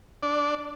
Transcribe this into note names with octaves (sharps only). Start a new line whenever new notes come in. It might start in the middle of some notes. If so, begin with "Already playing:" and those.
D4 D5